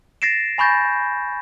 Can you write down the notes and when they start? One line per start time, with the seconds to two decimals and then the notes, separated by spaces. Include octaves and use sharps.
0.22 A6 A#6 C7 D7 E7
0.58 G#5 B5 C#6 G6 A6 A#6